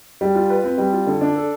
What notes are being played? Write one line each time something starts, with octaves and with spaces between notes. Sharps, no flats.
G3
F4
B4
C4
G3
F4
D3
D4
A4